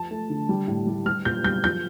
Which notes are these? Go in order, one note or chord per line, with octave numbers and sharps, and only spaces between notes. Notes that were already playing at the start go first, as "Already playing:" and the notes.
Already playing: F3 A5
A3
D3
G3
A2
G3
G3 F6
A#2 G6
G3 G6
F3 G6